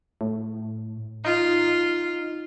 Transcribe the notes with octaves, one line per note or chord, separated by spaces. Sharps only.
A2
D#4 F4